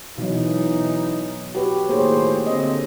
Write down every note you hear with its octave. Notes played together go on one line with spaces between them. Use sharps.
B2 E3 F#3 D#4
F#4 G4 B4
A2 D#3 A#3 G#4 C5 C#5
D3 A3 C4 D#5